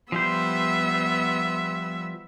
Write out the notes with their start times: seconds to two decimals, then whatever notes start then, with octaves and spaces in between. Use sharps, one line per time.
0.12 F3 G3 B3 C5 E5